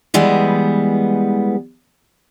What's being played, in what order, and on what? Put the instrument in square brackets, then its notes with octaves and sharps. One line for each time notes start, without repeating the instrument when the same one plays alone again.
[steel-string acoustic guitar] E3 G3 G#3 B3